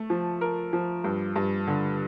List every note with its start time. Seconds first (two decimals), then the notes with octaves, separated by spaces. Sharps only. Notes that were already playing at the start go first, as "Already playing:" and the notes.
Already playing: A3
0.10 F3
0.41 A#4
0.73 F3
1.04 G2
1.36 G2
1.67 D3